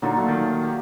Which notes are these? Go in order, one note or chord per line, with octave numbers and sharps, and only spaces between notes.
A#2 D3 F#3 A#3 D#4 F4
A#2 F#3 A3 D#4 F#4
D#3
G4